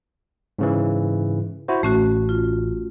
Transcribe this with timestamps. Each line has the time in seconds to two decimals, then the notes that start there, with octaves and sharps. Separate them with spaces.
0.59 G#2 C#3 E3
1.68 E4 F#4 C5
1.83 A1 A3 C#4 F#4
2.29 F4